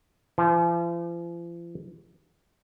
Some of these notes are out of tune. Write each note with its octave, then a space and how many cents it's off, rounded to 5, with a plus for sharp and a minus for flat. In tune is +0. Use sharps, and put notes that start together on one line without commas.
F3 -45